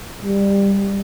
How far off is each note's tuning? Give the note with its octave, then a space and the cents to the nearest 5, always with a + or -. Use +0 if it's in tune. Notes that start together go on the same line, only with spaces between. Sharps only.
G3 +20